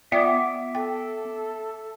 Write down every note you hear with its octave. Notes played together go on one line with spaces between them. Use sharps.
B3 F4 D5 E5 G5 D6
A4 G5